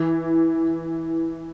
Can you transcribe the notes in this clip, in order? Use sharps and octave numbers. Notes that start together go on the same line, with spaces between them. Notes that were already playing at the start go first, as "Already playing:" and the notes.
Already playing: E3